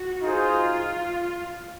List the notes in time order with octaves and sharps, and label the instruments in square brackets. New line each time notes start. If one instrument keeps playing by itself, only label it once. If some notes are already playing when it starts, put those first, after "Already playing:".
Already playing: [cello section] F#4
[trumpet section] D#4 G#4 C5 [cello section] F4